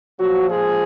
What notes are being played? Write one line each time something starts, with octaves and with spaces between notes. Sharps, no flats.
A#2 F3 F#3 F#4
G#3 G#4